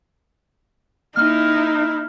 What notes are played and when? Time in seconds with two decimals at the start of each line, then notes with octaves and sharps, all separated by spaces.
1.16 A#3 D#4 E4 F6